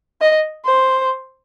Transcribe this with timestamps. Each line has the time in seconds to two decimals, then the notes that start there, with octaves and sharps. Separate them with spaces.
0.21 D#5
0.65 C5